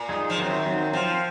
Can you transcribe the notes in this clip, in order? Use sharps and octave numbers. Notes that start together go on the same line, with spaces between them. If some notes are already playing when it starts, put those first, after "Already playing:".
Already playing: A#2
G#3 D#4 G#4
F3
F#2 D#3 F#3 C4
D#3 F#3 C4
F3 C4 F4 C5 F5